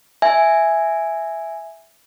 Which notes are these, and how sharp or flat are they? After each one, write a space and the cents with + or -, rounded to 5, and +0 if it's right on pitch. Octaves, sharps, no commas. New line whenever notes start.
E5 +0 G#5 +0